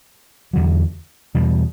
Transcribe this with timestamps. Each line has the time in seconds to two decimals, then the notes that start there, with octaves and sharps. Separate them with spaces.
0.53 E2 D3 F#3
1.35 E2 B2 G3